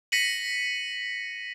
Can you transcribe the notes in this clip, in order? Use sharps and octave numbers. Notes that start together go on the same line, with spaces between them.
A#6 B6 C#7 D#7 F#7